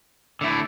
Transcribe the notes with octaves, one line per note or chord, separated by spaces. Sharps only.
D3 A3 E4